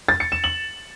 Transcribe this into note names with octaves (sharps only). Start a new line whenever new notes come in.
A6
C#7
E7
F#7